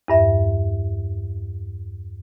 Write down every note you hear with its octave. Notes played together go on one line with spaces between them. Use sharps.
E2 G2 E5